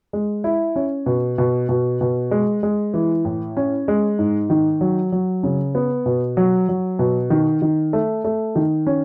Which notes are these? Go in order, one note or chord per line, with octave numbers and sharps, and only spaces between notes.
G#3
E4
C#4
B2
B2
B2
B2
G#3
G#3
E3
A2
C#4
G#3
G#2
D#3
F#3
F#3
C#3
B3
B2
F#3
F#3
B2
D#3
D#3
A3
A3
D#3
C#4